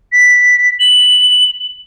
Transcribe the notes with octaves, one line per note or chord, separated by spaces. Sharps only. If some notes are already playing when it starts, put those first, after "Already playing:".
B6
F#7